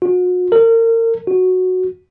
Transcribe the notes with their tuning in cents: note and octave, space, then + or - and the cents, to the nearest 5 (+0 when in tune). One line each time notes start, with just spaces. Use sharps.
F#4 -40
A#4 -35
F#4 -5